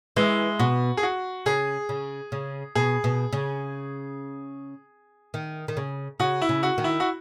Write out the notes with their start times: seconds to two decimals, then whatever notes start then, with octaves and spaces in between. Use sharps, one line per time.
0.16 E3 G#3
0.59 B2 F#4
0.97 G#4
1.03 F#4
1.46 C#3 G#4
1.89 C#3
2.32 C#3
2.75 B2 G#4
3.04 B2
3.33 C#3
5.34 D#3
5.68 D#3
5.77 C#3
6.20 C#3 F#4
6.42 E4
6.49 C#3
6.63 F#4
6.78 D#3
6.84 E4
7.00 F#4